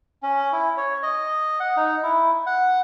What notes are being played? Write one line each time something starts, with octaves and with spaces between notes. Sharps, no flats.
C#4
E4
C#5
D#5
F#5
D#4
E4
F#5